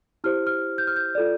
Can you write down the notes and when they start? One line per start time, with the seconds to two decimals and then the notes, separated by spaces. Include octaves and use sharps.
0.24 E4 G4 C5 F6
0.47 F6
0.78 G6
0.87 F6
0.96 G6
1.15 F4 A4 D5